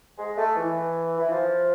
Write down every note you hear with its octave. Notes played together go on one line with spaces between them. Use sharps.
G#3
A3
E3
E3
F3